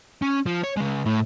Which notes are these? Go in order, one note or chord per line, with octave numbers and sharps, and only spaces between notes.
C#4
F3
C#5
C#3 G#3
A2